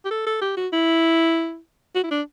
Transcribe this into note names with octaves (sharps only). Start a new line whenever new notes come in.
G4
A4
A4
G4
F#4
E4
F#4
E4
D4